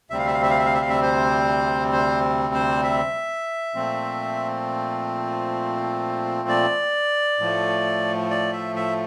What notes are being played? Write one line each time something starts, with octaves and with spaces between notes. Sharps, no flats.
D2 C3 G3 C4 E5
F5
E5
F5
E5
F5
E5
F5
E5
F5
E5
C5
C5
C5
E5
A#2 F3 A3 C4
D5
A2 F3 A3
D5
E5
E5